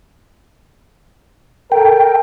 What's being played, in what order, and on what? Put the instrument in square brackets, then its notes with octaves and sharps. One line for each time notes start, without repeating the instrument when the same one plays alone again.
[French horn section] A4 A#4 [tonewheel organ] G5